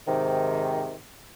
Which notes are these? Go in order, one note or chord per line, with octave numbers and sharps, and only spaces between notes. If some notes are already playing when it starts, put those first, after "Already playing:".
G#2 C3 D#3